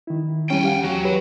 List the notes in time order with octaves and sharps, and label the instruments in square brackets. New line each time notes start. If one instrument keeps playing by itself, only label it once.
[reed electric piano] D#3 E4
[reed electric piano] D#2 G3 C#4 [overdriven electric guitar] G5 G#5
[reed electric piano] G4 F5 F#5
[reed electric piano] E2 [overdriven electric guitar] F#3
[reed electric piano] G4 B4 C#5